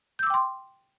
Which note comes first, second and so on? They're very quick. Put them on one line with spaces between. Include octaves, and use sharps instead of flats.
G6 E6 D6 G5 C6